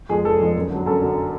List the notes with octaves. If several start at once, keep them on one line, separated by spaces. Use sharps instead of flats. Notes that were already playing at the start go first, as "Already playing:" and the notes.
F2 F3 G#3 G#4
F1 A4
F2 F3 G#3
F#2
D3 F#3
F#2 A4
D3 F#3